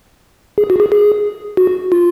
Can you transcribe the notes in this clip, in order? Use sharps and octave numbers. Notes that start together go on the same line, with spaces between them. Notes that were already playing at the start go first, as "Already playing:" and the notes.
G#4
F#4
G#4
G#4
F#4
F4